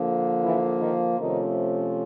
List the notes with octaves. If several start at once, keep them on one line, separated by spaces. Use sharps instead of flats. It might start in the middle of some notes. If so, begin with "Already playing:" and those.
Already playing: D3 F3 A#3
E3 E4
D#3 D#4
C3 D#3 F3 A3 C#4 D#4